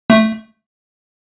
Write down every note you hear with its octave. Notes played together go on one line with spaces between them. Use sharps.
A3